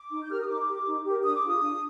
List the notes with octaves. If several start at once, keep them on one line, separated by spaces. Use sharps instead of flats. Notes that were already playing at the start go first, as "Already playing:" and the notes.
Already playing: D6
D#4
G6
G4 A#4 F6
D#6
D#4 D6
G4 A#4
D#4
G4 A#4
D4 D#6
D6
F4 G#4 D#6
D4